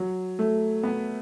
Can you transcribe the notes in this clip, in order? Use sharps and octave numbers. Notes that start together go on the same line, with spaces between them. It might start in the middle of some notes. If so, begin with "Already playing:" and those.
Already playing: F#3
A3
B3